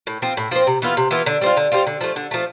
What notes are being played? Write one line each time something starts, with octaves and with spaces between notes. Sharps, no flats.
A2
F3 C4
A2
F3 C4
C3
E3 B3 F4
C3
E3 B3 F4
D3
G3 C4 F4
D3
G3 C4 F4
D3
F3 A3
D3
F3 A3